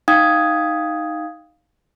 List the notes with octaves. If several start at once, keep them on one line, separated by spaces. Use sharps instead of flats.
D#4 F5 G5 D#6 G#6